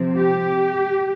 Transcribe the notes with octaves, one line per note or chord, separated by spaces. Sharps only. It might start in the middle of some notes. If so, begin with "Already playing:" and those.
Already playing: C3 F3 C4
G4